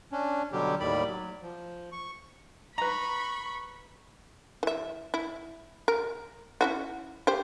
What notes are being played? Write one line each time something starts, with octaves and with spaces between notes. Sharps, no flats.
C#4 D4
B2 D3 F#3 G3 G4
D#2 A2 D#3 G3 D5 B5
F#3
F3
C#6
B4 A#5 B5 C#6
E3 E5
E4
A#4
C#4 E4 F#4
G4 C5